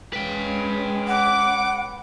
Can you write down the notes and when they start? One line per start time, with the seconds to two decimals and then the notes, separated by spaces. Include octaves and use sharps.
0.13 G#3 C#4 B4 G5
1.08 F#5 D6